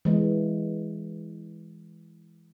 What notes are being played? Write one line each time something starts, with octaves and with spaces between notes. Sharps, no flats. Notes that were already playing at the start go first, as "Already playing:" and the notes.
E3 G#3 B3